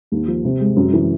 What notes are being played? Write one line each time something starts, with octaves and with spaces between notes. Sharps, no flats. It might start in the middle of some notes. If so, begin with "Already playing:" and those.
D#2
F3
C3
G#3
F#2
E3